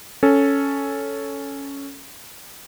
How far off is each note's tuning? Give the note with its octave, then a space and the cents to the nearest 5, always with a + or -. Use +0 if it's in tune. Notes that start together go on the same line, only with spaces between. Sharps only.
C#4 +5 A4 +0